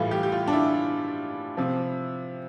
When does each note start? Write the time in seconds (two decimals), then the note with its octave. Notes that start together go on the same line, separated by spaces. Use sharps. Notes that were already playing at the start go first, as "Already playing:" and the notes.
Already playing: A2 E3 G3 F4
0.11 G4
0.23 G4
0.32 F4
0.48 D4
0.53 E4
1.57 C3 F3